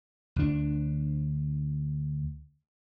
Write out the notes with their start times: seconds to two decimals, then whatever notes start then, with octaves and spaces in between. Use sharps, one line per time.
0.36 D2 D4